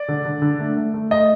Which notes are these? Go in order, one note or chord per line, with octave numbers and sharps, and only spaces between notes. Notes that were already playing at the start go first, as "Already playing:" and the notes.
Already playing: D5
D3
D3
D3
A3
A3
A3
A3 D#5